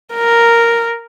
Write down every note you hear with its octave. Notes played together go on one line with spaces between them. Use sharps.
A#4